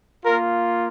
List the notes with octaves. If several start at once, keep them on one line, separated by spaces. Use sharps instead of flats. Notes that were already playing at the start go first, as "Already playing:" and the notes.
A#3 F4 A#4